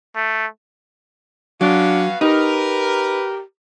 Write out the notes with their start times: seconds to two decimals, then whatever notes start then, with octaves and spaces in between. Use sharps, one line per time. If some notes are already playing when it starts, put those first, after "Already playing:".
0.16 A3
1.61 F#3 B3 C#4 D4 F#4 F5
2.21 D#4 G4 A#4 B4